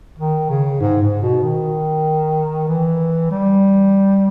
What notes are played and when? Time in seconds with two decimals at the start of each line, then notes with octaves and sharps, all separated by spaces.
0.18 D#3
0.50 C#3
0.80 G#2
1.02 G#2
1.23 B2
1.44 D#3
2.68 E3
3.31 G3